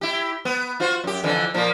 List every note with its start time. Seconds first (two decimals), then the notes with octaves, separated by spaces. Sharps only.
0.01 E4 G4
0.45 B3
0.80 F4 F#4 C5
1.04 F#2 G4
1.23 F2 D3 E3
1.54 A#2 F3 A#3